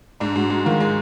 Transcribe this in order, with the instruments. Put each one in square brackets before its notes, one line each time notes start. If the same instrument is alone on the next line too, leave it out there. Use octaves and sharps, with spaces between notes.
[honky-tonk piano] G#2 [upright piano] D4
[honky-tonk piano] G#2 [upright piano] F#4
[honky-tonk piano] G#3 [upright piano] F#4
[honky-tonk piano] D#3 [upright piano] F4
[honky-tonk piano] G#3